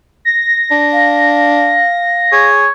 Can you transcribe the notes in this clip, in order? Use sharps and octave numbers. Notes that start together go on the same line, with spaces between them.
A#6
D4
F5
G#4 C#5